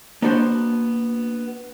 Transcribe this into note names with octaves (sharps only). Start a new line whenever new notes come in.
A#3 B3 D4 F#4 C5 C6